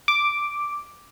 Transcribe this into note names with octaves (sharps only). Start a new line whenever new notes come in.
D6